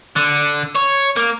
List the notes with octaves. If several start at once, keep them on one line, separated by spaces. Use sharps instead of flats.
D3
C#5
A#3